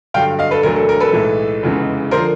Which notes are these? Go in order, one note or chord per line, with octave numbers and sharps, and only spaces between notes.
G2 D3 F#3 F5 G5
D#5 F5
A4 B4
E1 D2 D3 F#3 A3 A#4
A4
A#4
A4 B4
B1 A2 E3 G#3
F1 E2 C#3 E3 G#3
D3 F3 A#4 C5